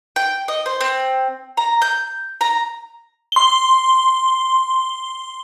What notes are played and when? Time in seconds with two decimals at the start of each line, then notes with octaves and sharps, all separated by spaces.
0.16 G5
0.48 D#5
0.66 C5
0.81 C4
1.57 A#5
1.82 G6
2.41 A#5
3.32 C6 G7